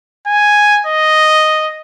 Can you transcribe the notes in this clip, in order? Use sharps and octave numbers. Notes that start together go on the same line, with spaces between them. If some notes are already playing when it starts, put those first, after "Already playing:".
G#5
D#5